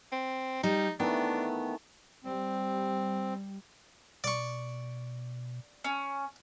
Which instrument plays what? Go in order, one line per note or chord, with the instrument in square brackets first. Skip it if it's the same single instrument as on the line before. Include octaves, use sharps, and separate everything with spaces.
[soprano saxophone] C4
[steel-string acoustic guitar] G3 [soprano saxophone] D#4
[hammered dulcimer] D#3 E3 A3 [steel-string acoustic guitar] B3 [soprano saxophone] D4
[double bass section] G3 [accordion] C4
[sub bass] B2 [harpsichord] D5 C#6
[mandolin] C#4